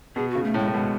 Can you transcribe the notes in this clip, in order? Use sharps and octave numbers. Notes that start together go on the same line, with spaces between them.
B2 G#4
C#3 F#4
A3
A2
G#3
A2
B2 G#3